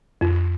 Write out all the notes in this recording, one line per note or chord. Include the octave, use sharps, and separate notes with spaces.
F2